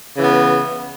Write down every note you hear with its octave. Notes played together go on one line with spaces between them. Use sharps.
C#3 E3 B3